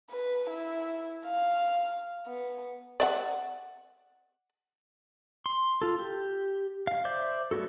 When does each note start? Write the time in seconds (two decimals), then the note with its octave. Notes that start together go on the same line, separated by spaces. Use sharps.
0.11 B4
0.50 E4
1.25 F5
2.27 B3
3.00 D5 E5 F#5
5.46 C6
5.82 F4 A4
5.99 G4
6.87 F5
7.05 C5 D5 E5 D6 G6
7.51 F#3 A3 B3 F#4 A4